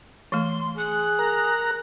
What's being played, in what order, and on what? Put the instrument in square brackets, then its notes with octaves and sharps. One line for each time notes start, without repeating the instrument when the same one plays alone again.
[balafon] E3 A3 [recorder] C6
[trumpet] G#4 [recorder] F#6
[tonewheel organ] A#4 A#5